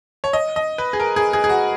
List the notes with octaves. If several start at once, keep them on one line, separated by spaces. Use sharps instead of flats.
C#5
D#5
D#5
B4
G#4
A#4
G#4
G#4
G#4
F#4